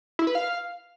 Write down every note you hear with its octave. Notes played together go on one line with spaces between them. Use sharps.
E4
B4
F5